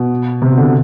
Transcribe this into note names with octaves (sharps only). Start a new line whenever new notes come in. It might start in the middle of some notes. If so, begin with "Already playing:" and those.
Already playing: B2
C3
B2
D3
C3